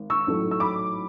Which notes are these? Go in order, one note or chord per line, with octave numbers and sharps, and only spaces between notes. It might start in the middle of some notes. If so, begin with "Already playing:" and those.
Already playing: G#1
C#6 E6
A1 G#2 F#3 A3
E6
B5 D6